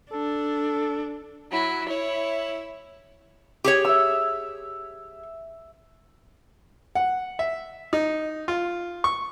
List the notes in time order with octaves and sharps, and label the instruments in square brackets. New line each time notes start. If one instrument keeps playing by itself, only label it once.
[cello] D4 [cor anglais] A4
[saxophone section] F#3 [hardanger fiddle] E4
[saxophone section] E4 [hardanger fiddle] C#5
[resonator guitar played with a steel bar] G4 G#4 C#5
[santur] E5 E6
[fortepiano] F#5
E5
D#4
F4
C#6